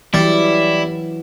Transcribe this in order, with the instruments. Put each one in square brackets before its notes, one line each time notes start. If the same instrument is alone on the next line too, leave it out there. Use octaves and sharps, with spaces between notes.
[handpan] E3 F#3 [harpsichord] G3 [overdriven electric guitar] E4